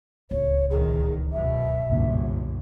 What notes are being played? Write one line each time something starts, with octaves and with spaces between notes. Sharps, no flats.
D1 C#2 C#5
A#1 E2 D#3 G#4
F#2 B2 E5
G1 C2 F#2 A#2 D3